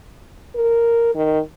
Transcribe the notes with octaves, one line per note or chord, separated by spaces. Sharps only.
A#4
D#3